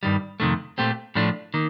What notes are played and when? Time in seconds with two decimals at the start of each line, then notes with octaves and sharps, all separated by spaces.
0.03 G2 D#3 G3
0.40 F2 C3 D#3 A3
0.78 A#2 A3 C4 G4
1.15 A2 F3 A3 D4
1.54 D#3 A#3